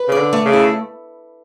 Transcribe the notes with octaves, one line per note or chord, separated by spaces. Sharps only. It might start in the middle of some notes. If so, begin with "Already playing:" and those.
Already playing: B4
C#3 D5
D3
A3
C#3
E4